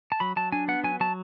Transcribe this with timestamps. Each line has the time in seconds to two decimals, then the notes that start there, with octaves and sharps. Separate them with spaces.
0.12 A5
0.20 F#3 B5
0.36 F#3 A5
0.52 D4 G#5
0.68 B3 F#5
0.84 F#3 G#5
1.00 F#3 A5